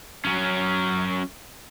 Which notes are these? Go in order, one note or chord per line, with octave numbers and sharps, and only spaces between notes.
F#3 C#4